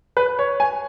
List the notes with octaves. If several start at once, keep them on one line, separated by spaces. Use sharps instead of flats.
B4
C#5
G#5